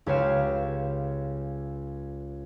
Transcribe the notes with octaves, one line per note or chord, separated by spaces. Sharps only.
C#2 G4 B4 C#5 F5 E7